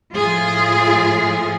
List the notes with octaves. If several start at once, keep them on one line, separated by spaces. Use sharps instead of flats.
A2 F3 F4 G#4